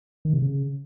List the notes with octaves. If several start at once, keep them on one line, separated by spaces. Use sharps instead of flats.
D#3
C3
C#3